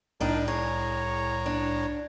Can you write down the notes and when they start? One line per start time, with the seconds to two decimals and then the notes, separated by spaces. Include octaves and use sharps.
0.21 C2 A2 D4 D#4 A#4 G5 A5
0.48 G#4 C#5 A#5
1.46 D4